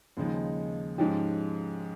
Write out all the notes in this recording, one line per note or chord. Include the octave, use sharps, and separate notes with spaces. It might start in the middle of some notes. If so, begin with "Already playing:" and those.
D#2 C#3 F3 G#3 D#4
G#2 F3 G#3 C#4 G4